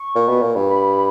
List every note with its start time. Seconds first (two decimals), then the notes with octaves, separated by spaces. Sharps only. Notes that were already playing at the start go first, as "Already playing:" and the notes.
Already playing: C#6
0.15 A#2
0.29 B2
0.42 A#2
0.56 G2
0.69 B5